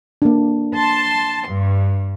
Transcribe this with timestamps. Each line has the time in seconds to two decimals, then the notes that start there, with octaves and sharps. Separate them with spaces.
0.22 A#3 D4
0.76 A5 C6
1.49 G2